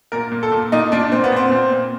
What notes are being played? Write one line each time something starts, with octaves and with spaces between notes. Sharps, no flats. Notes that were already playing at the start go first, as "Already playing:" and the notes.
A#2 A#4
A#2
A4
A#2
A#2 D#4
A#2 D4
A#2 C4
B3
A#2 C4
A#2
A#2